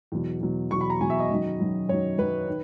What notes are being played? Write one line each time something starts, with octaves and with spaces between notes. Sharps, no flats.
E2 B2 F#3
E2 B2 F#3
E2 B2 F#3 C#6
B5
A#5
E2 B2 F#3 G#5
E5
D#5
F#2 D#3 F#3
F#2 D#3 F#3
F#2 D#3 F#3 C#5
F#2 D#3 F#3 B4
D#3